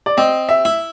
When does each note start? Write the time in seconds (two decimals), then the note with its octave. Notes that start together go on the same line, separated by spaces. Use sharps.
0.06 D5
0.17 C4 D#5
0.49 E5
0.65 E4